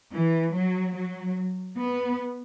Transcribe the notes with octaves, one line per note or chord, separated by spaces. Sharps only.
E3
F#3
F#3
B3